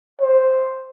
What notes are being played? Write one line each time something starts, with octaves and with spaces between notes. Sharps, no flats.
C5